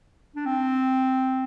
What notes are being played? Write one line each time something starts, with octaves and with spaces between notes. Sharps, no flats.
D4
C4